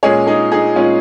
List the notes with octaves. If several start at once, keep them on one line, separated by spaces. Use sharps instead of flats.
A#2 G#3 C#4 G#4 C#5
D#4 G#4
D#4 G#4
A#2 G#3 C#4 F4